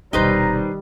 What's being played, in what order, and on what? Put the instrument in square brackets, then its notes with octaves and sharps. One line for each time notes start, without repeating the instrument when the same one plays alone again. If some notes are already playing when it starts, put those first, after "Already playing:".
[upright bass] E1 C3 [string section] D#3 G3 [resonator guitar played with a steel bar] D#4 B4 C5 [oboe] A#5